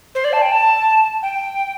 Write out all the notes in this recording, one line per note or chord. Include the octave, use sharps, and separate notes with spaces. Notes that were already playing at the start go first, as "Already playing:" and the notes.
C5
D5
A5
G5
A5
G5